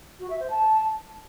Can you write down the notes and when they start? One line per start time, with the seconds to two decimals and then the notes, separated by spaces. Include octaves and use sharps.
0.20 F#4
0.30 E5
0.40 C5
0.50 A5